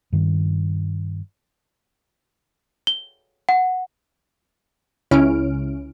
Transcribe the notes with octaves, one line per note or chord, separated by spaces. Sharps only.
G2 D#3
G7
F#5
C#2 C#3 C#4 E4 F6 D7